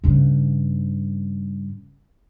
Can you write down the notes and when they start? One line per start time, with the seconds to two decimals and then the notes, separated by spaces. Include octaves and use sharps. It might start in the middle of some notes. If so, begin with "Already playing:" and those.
0.04 G2 C#3